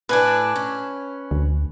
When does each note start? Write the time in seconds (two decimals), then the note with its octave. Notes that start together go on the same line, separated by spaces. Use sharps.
0.09 A2 D4 B4 G#5
0.56 C#4
1.31 D2